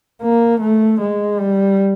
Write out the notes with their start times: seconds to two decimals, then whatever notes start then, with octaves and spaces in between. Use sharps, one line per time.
0.22 A#3
0.61 A3
1.00 G#3
1.39 G3